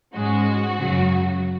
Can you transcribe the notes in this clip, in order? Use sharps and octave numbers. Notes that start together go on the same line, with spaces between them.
G#2 G#3 C#4 F#4
F#2 C#3 F#3